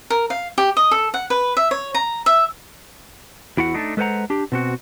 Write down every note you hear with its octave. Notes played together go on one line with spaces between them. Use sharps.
A#4
F5
G4
D#5
A4
F#5
B4
E5
C#5
A#5
E5
E2 E4 F#4 F#5
A3 D4 D#4
G#3 A4 B4 C5 F#5 A#5
D4 G4
B2 C4 F#4